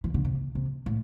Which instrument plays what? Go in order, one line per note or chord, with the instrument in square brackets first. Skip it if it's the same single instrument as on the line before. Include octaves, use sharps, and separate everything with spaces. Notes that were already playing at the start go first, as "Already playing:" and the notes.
[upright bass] E3
D3
C3
C3
A2